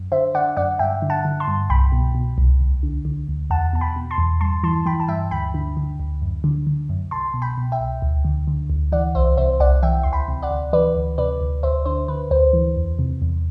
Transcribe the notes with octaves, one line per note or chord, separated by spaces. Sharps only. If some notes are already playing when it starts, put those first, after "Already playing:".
Already playing: F#2
D3 C5 E5
D3 D5 F#5
F#2 D5 F#5
G2 E5 G5
D3
F#5 A5
D3
A5 C6
G2
C2 G5 B5
B2
B2
C2
D2
D3
D3
D2
E2 F#5 A5
B2 A5
G5 B5
B2
A5 C6
E2
G2 A5 C6
E3 A5 C6
E3 G5 B5
A5
G2 E5 G5
D2 G5 B5
D3
D3
D2
F#2
D3
D3
F#2
C2 A5 C6
B2
G5 B5
B2
E5 G5
C2
D2
D3
D3
D2
E3 D5 F#5
C2 C5 E5
C3 C5 E5
C2 D5 F#5
E3 E5 G5
D2 C6
G5 B5
C3
D5 F#5
D2
E3 B4 D5
D2
C3 B4 D5
D2
D2 C5 E5
D3 C5
D3 B4
D2 C5
E3
E2
C3
E2